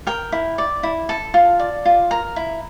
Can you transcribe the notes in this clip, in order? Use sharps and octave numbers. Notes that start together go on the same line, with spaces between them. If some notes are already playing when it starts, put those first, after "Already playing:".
A#4 G5
E4
D5
E4
A4 A5
F4
D5
F4
A#4 A#5
E4